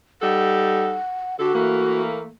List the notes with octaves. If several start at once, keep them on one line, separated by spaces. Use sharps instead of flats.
G3 D#4 A4 F#5
D3 F#4 G4 A4
E3 A3 A#3